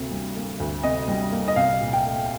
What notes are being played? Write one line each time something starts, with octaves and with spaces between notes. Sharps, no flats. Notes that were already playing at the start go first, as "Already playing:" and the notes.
Already playing: D2 C3 A#3
G3
A#3
D2
C3 D#5
G3
A#3
D#5
C2 F5
A#2
G5
A3